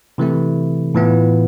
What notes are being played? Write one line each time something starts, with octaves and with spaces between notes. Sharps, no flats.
C3 E3 A3 E4
A2 E3 B3 F4